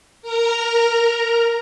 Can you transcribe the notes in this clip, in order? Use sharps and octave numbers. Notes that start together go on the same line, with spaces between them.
A#4 A#5